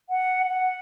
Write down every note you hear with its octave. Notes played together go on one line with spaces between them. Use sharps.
F#5
F#5